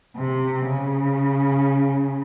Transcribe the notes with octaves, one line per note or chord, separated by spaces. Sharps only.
C3
C#3